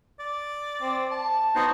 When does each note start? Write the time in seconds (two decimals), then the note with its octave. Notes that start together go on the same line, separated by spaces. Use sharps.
0.20 D5
0.81 C4
1.11 A5
1.55 B3 D#4 F#4 C5